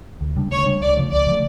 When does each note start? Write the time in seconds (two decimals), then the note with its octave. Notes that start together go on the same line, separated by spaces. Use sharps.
0.21 D2
0.36 C#3 G3 D4
0.51 D2 C#5
0.66 C#3 G3 D4
0.81 C#2 D5
0.96 C#3 F3 A3
1.12 C#2 D5
1.27 C#3 F3 A3